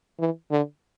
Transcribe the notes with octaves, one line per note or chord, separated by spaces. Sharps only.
E3
D3